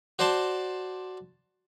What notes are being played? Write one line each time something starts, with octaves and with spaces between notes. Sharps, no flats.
F#4 C5 D5 A5 C6